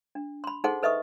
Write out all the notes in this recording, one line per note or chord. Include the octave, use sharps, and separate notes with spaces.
D4
B5 C6
D#4 G#4 A4 C5 F#5 C6
A4 B4 D#5 E5 C#6 D#6